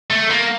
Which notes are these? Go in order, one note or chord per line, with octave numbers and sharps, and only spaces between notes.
A3
A#3